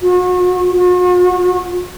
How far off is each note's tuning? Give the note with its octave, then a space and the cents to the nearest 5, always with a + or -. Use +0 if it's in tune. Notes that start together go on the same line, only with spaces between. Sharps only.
F#4 -35
F#4 -45